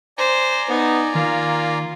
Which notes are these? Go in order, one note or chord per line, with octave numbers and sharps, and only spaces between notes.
C5 D5 G#5 A#5
B3 D#4
D#3 A#3 F4